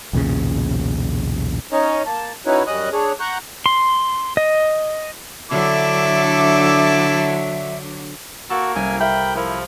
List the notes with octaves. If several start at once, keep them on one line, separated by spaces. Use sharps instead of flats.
B1 E2 A#2 C#3
C#4 D#4 C#5 D#5
A#3 A5
C#4 D#4 E4 F#4 B4 C#5
F#2 G3 C#4 D#5 D#6 F#6
D4 G#4 C#5
F#5 A#5 C#6 F#6 G6
C6
D#5
D3 F#3 D4 E4 A4 E5 D6
A#3 F#4 A4
C2 C#4 G#5
A#4 E5 F5 G5 B5
F3 E4 A#4